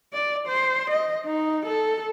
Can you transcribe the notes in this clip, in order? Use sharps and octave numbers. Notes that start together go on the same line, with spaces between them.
D5
C5
D#5
D#4
A4